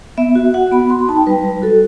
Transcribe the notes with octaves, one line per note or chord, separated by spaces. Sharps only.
B3 E5
F#4
F#4 F#5
B3 B5
F#4 C6
B5
D#4 A5
G5
G3 B4
G3
F#4 A4